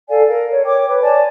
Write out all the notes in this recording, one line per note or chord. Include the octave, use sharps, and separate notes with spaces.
A4 D5 F5 G#5
A#4
C#5
C#5 G5 D6
B4
C#5 D5 G#5 A5